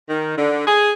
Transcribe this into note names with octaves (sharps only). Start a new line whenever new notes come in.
D#3
D3
G#4